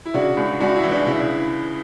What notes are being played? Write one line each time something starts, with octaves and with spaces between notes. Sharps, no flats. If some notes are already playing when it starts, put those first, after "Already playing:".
E4
C#3 D4 F#4
C#2
C#2 D4 F#4
E4
E3
D4
C#3 E4